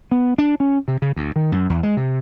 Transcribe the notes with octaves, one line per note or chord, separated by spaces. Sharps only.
B3
D4
C#4
C3
C#3
D2
D#3
F#2
E2
G#3
C3